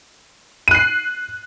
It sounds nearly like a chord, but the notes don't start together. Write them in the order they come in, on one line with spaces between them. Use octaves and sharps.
D#7 F#6 C7